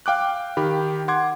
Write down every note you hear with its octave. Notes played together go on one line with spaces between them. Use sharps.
F5 G5 D6 F#6
D#3 G4 B5
F#5 C6 D6 G#6